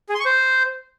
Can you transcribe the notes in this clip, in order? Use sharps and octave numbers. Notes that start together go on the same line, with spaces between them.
G#4
C6
C#6
C5